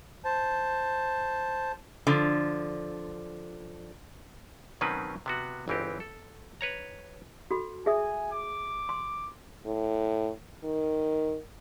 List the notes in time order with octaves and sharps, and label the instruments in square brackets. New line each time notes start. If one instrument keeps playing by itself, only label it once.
[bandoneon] C5 A5
[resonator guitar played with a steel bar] D3 F3
[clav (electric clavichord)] B2 D#3 F#3 C4 C#4 B4
C3 B3 F#4
G1 C#2 E3 C4 D#4 G4
A4
B4 C#5 A#5
[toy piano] F#4 A4 B5
[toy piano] G#4 E5 D#6 [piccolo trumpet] G#5
[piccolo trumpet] D6
[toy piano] C6
[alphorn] A2
D#3